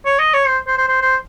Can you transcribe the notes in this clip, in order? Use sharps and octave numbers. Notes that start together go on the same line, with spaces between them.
C#5
D#5
C#5
C5
C5
C5
C5
C5